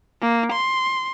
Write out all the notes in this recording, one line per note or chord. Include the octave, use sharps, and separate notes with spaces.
A#3
C6